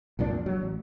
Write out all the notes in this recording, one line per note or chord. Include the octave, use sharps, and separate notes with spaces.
C2 F2 A#2 D4
F#3
A1